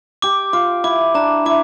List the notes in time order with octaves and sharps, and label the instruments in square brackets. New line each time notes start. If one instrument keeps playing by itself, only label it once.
[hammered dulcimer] G4 [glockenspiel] D6
[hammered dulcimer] F4 [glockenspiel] D6
[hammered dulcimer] E4 [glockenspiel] D6
[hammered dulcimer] D4 [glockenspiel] A#5
[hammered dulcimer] E4 [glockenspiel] D6